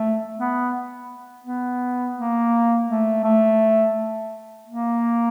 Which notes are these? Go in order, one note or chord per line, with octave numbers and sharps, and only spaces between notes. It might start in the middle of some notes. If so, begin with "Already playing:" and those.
Already playing: A3
B3
B3
A#3
A3
A3
A#3